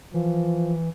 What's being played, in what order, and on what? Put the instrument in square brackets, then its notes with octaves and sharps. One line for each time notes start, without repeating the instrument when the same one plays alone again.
[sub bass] E3 [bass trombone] F3